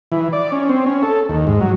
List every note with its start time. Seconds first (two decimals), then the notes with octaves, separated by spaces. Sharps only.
0.12 E3
0.33 D5
0.52 C#4
0.69 C4
0.86 C#4
1.03 A4
1.29 D#2
1.47 G#2
1.61 F#3